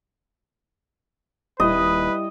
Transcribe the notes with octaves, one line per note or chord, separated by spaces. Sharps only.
D#1 G3 E4 B4 D#5